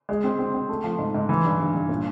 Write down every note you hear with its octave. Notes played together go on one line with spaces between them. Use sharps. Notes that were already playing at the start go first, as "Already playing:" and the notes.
G#3
C4
C4
C4
A3
F3
G#2
G#2
E3
G2
G2
G2
A#2